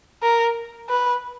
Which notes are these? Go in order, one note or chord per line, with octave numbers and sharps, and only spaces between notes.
A#4
B4